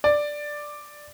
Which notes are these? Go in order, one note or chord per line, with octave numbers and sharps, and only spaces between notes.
D5